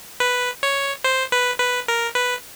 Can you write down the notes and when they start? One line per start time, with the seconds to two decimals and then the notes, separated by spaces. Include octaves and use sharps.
0.20 B4
0.63 C#5
1.04 C5
1.32 B4
1.60 B4
1.88 A#4
2.15 B4